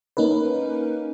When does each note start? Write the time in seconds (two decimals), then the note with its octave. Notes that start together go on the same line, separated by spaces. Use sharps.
0.17 A#3 C#4 D#4 A#4 B4